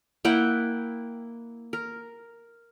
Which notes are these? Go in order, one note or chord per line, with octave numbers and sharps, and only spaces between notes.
A#3 E4 F#5 G5
A#4